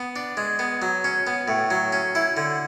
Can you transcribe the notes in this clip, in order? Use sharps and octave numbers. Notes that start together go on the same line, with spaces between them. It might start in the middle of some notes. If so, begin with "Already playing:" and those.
Already playing: B3
D4
G#3
B3
F#3
C#4
B3
A2
F#3
C#4
E4
D3